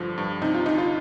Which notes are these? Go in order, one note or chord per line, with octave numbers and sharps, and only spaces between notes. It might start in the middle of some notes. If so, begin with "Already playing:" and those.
Already playing: G2 D3 F3
G2
C3 D#4
F4
D2 D#4
F4